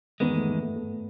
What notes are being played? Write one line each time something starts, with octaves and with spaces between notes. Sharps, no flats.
E2 D#3 G#3 B3
A3
A3
A3
A3